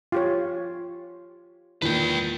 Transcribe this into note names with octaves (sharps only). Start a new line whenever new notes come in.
F4 G4 C#5
E2 A#2 D#3 B4 G5